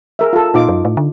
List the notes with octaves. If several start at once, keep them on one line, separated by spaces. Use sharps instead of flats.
G#4 A#4 E5
F4 A4
A#2 D#4 F4 D6
F#2
A2
D3